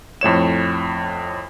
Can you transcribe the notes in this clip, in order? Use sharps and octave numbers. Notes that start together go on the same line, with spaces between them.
F2 A2 C#5 E7